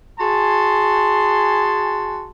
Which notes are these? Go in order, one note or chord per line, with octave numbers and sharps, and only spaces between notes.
F#4 G#4 G#5 A5 C6